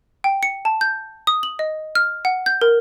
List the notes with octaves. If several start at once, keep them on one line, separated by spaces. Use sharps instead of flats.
G5
C#7
A5
G6
D#6
F#7
D#5
F6
F#5
G6
A#4